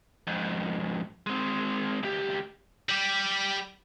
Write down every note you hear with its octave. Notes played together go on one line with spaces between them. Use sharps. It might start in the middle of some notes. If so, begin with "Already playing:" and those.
F2 G#2
G#3 C4
C#2 G4
G3 G4